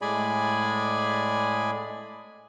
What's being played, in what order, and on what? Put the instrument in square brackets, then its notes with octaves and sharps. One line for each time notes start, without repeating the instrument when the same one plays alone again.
[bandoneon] A2 G#3 G#4 D5 G#5 B5